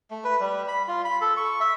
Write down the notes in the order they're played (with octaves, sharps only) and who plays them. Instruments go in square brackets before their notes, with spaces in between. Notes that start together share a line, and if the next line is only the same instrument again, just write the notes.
[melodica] A3
B4
G3
B5
F4
B5
A4
C#6
E5